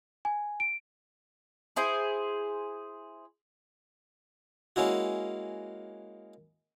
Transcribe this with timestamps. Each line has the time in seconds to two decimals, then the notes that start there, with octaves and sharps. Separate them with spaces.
0.25 G#5
0.60 D7
1.76 E4 G#4 C5
4.76 G#3 A#3 C#4 E4 F#4